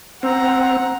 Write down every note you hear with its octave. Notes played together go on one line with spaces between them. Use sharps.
C4 F#5 A#5